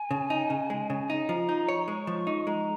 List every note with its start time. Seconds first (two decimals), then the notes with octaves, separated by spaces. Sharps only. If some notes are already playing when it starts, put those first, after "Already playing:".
Already playing: G#5
0.11 C#3
0.30 D#4
0.50 C#3
0.70 G#3
0.90 C#3
1.10 D#4
1.29 F3 A#5
1.49 D#4
1.69 C#5
1.88 G#3 C#6
2.07 F3
2.27 D#4
2.47 G#3 A#5